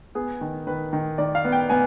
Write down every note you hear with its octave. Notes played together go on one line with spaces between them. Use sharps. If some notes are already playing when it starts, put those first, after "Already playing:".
B3 G#4
D#3
D#3 B4
D#3
D#3 D5
F5
B3
G5
B3 G#5